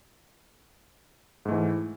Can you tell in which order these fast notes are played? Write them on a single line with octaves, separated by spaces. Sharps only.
G#2 A3 E3